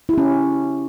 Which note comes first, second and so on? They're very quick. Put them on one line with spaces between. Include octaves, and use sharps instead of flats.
E4 G4 C#4